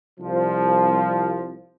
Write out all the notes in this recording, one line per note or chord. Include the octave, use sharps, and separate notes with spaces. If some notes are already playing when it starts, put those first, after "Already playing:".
C2 F3